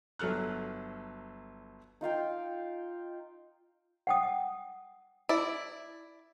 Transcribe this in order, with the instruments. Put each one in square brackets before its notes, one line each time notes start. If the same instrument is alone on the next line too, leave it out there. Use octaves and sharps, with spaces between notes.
[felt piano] G1 F#3 A4 F6 F#6
[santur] D#4 F4 F5 G5
[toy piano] F#5 G5 D#6
[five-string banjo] E4 D5